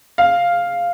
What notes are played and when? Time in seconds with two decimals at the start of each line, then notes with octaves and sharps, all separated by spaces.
0.18 F5